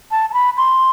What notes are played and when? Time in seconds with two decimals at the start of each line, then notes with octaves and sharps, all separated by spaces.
0.11 A5
0.30 A5
0.34 B5
0.57 C6